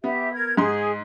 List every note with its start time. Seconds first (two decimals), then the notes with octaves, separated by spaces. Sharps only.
0.04 B3 G4 E5
0.33 A#4 G#6
0.57 G#2 G#4 C6